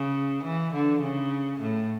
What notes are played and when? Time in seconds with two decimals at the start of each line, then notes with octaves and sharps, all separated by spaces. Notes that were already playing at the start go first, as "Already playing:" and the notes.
Already playing: C#3
0.44 E3
0.74 D3
1.03 C#3
1.61 A2